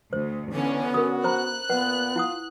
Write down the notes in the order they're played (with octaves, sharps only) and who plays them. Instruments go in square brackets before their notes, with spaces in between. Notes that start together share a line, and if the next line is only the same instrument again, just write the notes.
[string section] D2 [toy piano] C5
[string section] D3 C#4 [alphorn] E3 [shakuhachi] B3
[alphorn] F#4 [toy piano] A#4 D#6
[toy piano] C5 A#5 B5 [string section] F#6
[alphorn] A#2 [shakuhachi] B3 [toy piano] B4 F#5
[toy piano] E4 F#5 D#6 [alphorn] F4